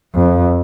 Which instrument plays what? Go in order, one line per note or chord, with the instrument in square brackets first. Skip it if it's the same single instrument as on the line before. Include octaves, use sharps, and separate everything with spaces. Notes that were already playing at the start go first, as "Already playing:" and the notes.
[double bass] F2